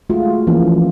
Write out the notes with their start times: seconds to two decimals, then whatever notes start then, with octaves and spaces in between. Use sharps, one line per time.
0.10 G#3 A3 F4 F#4
0.47 E3 F3 A#3 C#4